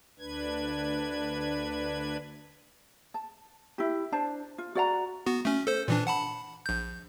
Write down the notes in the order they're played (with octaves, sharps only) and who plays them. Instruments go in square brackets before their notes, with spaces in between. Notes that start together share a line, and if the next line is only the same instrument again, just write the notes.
[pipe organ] D2 D4 B4 G#6
[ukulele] A5
E4 G4
D4 C5 A5
F4
F#4 D5 F#5 A#5
[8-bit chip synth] B3 F#4
A3 C#4
A4 C5
A#2 E3 D4
F#5 A5 B5
A#1 G6